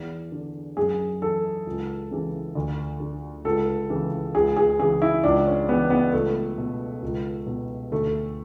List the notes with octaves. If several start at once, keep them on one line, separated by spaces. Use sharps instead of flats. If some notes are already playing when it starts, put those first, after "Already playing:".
Already playing: E2
D3
F#2 G#4
E3 A4
C#2
C#3 E3
D2
D3
C#2 A4
C#3 E3
C#2 G#4
G#4
C#3 E3 G#4
E4
C#2 D4
C#4
C#3 E3 B3
B3
C#2 A3
B2
C#2
B2
D2 A3